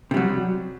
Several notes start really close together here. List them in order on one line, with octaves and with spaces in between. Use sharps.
C3 G3 F#3